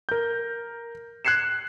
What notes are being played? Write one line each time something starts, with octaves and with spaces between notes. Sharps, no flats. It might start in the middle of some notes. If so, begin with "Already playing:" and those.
A#4 G6
F#6 G#6 C7 C#7 E7